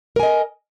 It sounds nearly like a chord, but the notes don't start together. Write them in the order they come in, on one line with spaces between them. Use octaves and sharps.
A#4 G#5 D#5